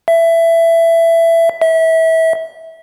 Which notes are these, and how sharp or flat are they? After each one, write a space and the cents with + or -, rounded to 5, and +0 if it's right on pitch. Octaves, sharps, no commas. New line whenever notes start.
E5 +15
E5 -25